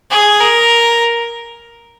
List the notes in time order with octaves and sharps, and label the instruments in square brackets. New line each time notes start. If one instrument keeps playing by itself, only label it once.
[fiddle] G#4
A#4